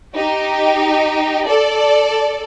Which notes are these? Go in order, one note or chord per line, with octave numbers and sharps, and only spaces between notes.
D#4 G4
A4 D5